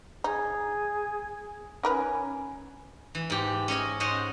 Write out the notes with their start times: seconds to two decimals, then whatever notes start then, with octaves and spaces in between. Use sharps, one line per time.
0.24 D#4 G#4
1.83 C#4 D#4 A#4 B4
3.15 E3
3.30 G#2 G4
3.68 C#4 C#5 D#5 G#5
4.00 G#2 C5 C#5 D#5 F#5